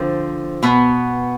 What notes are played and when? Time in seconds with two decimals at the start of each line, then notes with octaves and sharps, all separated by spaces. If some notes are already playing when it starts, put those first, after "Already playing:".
Already playing: D3 F3 C4 C5
0.63 B2 B3